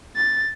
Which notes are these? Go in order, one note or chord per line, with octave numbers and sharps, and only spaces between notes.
A6